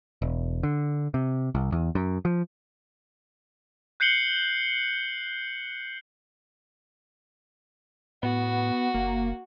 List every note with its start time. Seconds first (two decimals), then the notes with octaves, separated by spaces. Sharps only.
0.22 E1
0.63 D3
1.14 C3
1.55 C2
1.72 E2
1.95 F#2
2.25 F3
4.00 F#6 G6 C7 C#7 F#7 G7
8.23 A2 B3 F#4
8.94 F#1 A#3